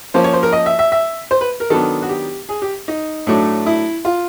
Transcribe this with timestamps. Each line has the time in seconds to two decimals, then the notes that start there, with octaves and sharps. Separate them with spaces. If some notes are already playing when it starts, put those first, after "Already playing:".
0.14 F3 A#3 C#4 C5
0.24 C#5
0.33 C5
0.43 A#4
0.53 D#5
0.66 E5
0.79 E5
0.92 E5
1.31 C5
1.41 B4
1.60 A#4
1.70 D#3 F#3 B3 D4 A4
2.02 F#4
2.09 G4
2.49 G#4
2.62 G4
2.88 D#4
3.27 A2 F#3 A3 D4
3.66 E4
4.05 F4